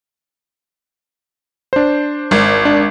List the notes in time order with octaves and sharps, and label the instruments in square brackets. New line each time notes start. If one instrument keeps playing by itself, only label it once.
[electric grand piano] D4 C5
[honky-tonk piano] G#1
[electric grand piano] D4